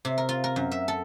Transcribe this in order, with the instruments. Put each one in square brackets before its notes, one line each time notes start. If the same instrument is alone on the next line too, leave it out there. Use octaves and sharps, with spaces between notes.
[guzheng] C3
A#4
F4
A#4
F#2
E5
A4